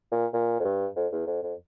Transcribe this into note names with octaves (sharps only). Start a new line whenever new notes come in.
A#2
A#2
F2
G2
F2
E2
F2
F2